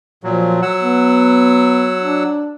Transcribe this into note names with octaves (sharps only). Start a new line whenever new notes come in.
A#2 F3 F#3
F#3 F#5 E6
B3
D4